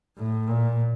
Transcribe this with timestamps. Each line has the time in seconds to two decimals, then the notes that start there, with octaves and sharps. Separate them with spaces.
0.18 A2
0.48 A#2